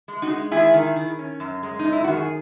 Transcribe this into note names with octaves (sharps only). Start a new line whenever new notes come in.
G#3
D#4 F#4
G#3
D#3 E4 G#4
D#3
D#3
C#4
F#2
G#3
D#4
F#2
E4
D#3 F#4
G#4